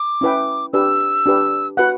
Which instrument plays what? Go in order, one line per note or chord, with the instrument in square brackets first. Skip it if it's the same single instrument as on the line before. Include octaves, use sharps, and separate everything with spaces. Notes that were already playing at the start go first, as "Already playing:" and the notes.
Already playing: [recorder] D6
[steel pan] C#4 E4 B4 E5 G5
[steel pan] D4 G4 B4 [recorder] E6
[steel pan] D4 G4 B4
[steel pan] F#4 B4 F#5 [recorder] F#6